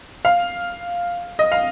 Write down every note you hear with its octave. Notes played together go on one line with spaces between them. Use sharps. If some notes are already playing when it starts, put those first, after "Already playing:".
F5
D#5
F5